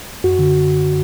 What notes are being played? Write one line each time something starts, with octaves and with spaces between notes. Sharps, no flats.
F#2 F#4
D3